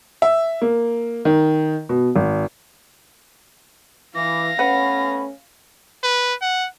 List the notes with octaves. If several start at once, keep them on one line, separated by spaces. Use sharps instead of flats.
E5
A#3
D#3
B2
G#1
E3 F5 D6 A#6
A3 B3 C#4 B4 F#5 B5
B4
F#5